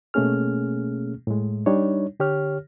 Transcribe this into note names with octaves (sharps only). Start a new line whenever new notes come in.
B2 A3 A#3 C#4 G#4 F6
A2 G#3
G3 D4 D#4 C#5
D3 G4 C#5 F6